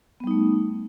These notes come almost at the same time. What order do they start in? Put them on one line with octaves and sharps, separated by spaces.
B3 G3 D#4 A3